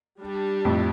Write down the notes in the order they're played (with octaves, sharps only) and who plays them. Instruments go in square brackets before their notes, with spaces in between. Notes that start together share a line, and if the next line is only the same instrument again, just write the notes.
[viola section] G3 D4 G4
[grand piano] F2 A2